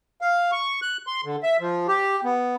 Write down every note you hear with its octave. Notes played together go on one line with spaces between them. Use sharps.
F5
C#6
F#6
C6
D3
E5
F3
G4
B3